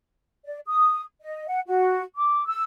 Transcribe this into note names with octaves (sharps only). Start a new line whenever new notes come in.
D5
D#6
D#5
F#5
F#4
D6
E6